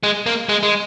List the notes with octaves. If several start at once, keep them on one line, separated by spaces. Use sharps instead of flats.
G#3
A#3
G#3
G#3